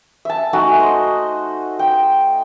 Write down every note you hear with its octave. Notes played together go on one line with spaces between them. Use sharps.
E5 A5
A3 D#4 F#4 G#5
C5 D#5
G5